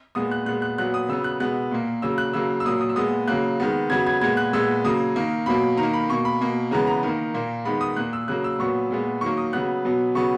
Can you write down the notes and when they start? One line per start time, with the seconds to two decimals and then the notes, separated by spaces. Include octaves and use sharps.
0.15 A#2 G#3 B3 D#6
0.31 F#6
0.46 A#2 G#3 B3 F#6
0.62 F#6
0.78 A#2 F#3 B3 F#6
0.94 D#6
1.09 C#3 F#3 B3 E6
1.24 F#6
1.40 B2 G#3 B3 F#6
1.71 A#2 A#3
2.02 C#3 F#3 A#3 E6
2.18 F#6
2.33 C#3 F#3 A#3 E6
2.60 E6
2.65 A#2 F#3 A#3 D#6
2.81 D#6
2.89 E6
2.96 A#2 G#3 B3 D#6
3.28 C#3 F#3 A#3 F#6
3.60 D#3 G#3 B3
3.90 C#3 F#3 B3 G#6
4.07 G#6
4.21 A#2 G#3 B3 G#6
4.37 F#6
4.53 A#2 G#3 B3 E6
4.84 C#3 F#3 A#3 D#6
5.16 D#3 A#3
5.46 B2 F#3 A#3 B5
5.77 D#3 A#5
5.83 A#3
5.94 B5
6.09 B2 A#3 C#6
6.25 B5
6.41 B2 A#3
6.71 C#3 E3 G#3 B3 A#5
6.87 A#5
7.03 D#3 A#3
7.34 A#2 A#3
7.65 D#3 G#3 B3 B5
7.81 D#6
7.96 A#2 A#3 F#6
8.13 E6
8.28 C#3 F#3 A#3 F#6
8.44 E6
8.59 A#2 F#3 B3 C#6
8.91 A#2 G#3 B3
9.21 D#3 F#3 A#3 C#6
9.37 D#6
9.53 C#3 F#3 B3 F#6
9.85 B2 F#3 B3
10.15 C#3 F#3 B3 C#6